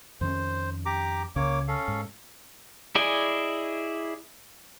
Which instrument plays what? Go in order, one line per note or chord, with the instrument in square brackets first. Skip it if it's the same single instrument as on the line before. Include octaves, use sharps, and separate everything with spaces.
[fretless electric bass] F2 D#3 C#4 [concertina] C5
[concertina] G4 A#5 D6
[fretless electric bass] C#2 C#3 [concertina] A#3 C#5 D6
[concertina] C#4 A4 F5
[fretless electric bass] G#2
[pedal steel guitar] E4 G#4 D5 D#5 G#5